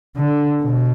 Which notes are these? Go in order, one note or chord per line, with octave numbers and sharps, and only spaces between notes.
D3
B2